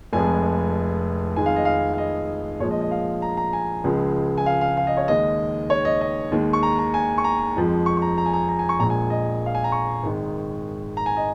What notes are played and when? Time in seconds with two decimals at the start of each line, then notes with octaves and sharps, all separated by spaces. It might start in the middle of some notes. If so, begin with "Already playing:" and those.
0.13 F1 F2 F3 G#3 G#5
1.36 F2 D#3 G#3 G#5
1.46 F5
1.56 D#5
1.65 F5
1.94 F5
1.98 D#5
2.60 A#1 A#2 F3 G#3 C#5
2.71 D#5
2.81 D#5
2.91 F5
3.22 A#5
3.37 A#5
3.53 G#5
3.84 C#2 C#3 F3 G#3
4.38 G#5
4.46 F5
4.61 F5
4.77 F5
4.87 D#5
4.97 C#5
5.08 D#2 D#3 G#3 D#5
5.70 C#5
5.85 D#5
6.01 D#5
6.32 D#2 D#3 G#3
6.53 C#6
6.63 A#5
6.79 A#5
6.94 G#5
7.18 C#6
7.24 A#5
7.56 F2 F3 G#3
7.86 C#6
7.97 C#6
8.02 A#5
8.18 A#5
8.26 G#5
8.33 A#5
8.49 A#5
8.59 G#5
8.69 C#6
8.80 A#1 A#2 G#3 A#5
8.90 G#5
9.10 D#5
9.46 F5
9.55 G#5
9.64 A#5
9.72 C#6
10.03 G#1 G#2 D#3 G#3
10.97 A#5
11.06 G#5
11.17 D#5